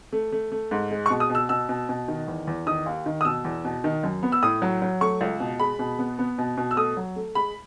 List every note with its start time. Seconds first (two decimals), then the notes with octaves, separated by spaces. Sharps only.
0.13 A3
0.32 A3
0.52 A3
0.71 G#2
0.91 G#3
1.06 C#6
1.10 B2
1.20 D#6
1.30 B2
1.35 E6
1.49 B2 E6
1.69 B2
1.89 B2
2.08 D#3
2.28 E2
2.47 E2
2.67 D#3 D#6
2.86 D#2
3.06 D#3
3.21 D#6
3.25 B2 E6
3.45 E2
3.65 B2
3.84 D#3
4.04 F#2
4.23 B3
4.32 E6
4.43 A2 D#6
4.62 F#3
4.82 F#3
5.01 A3 C#6
5.21 C#2
5.40 B2
5.60 G#3 B5
5.79 B2
5.99 B3
6.19 B3
6.38 B2
6.57 B2
6.71 E6
6.77 A3 D#6
6.97 F#3
7.16 A3
7.35 G#3 B5